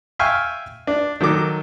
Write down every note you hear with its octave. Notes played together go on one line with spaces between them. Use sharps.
E5 F5 G5 G#5 C#6 F6
D4
D#3 F#3 A4 D6